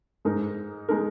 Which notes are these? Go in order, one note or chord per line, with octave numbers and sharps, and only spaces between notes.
G#2 G#3 D#4 A#4
G#3 D#4 A#4